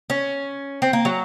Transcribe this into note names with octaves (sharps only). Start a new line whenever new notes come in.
C#4
C4
A#3
F#3